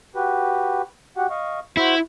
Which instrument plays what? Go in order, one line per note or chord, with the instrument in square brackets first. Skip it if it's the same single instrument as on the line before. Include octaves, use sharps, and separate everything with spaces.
[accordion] F#4 G4 B4
F#4 G4 F#5
D#5 F5 C#6
[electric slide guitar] E4 [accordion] F#4 C5